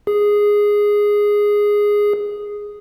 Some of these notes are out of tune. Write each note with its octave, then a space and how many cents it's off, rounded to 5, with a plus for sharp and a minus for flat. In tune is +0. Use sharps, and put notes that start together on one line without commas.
G#4 -5